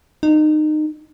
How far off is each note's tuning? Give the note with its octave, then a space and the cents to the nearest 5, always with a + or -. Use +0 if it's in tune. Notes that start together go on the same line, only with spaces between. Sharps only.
D#4 -25